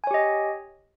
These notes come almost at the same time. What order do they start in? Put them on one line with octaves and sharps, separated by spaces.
G#5 C#5 G4 D#5